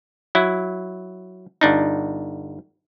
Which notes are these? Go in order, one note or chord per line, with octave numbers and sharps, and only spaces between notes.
F#3 E4
G1 D4 D#4